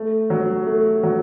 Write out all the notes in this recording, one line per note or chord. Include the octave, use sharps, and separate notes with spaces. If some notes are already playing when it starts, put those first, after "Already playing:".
Already playing: A3
F#3
A3
F#3